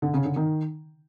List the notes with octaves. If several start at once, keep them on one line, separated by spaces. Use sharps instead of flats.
D3
C#3
D3
D#3